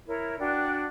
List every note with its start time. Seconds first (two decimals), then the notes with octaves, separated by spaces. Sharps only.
0.07 E4 A#4 C#5
0.40 D4 F#4 D5 G5